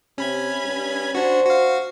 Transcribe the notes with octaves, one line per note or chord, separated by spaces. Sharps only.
C3 C#4 B5 G#6
G2
D4 F#4 C5
F#4 F5